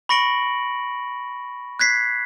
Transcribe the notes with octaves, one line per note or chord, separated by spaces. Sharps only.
B5 C#6 A#6 C#7 D7 F#7
F#6 G#6 B6 C7